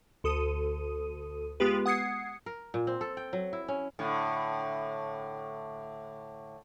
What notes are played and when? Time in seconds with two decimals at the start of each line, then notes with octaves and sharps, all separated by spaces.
0.24 D2 A4 D#6 D#7
1.60 G#3 B3 F4 G4 B4
1.86 F#5 D#6 G#6 C7 C#7
2.46 A#4
2.74 A#2
2.87 C4
3.01 A4
3.17 G5
3.33 F#3
3.53 E4
3.68 C#4
3.99 A2 D3